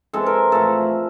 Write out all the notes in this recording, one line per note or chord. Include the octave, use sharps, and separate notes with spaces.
E3 G#3 C4 A4
A#4
A2 F3 A3 A4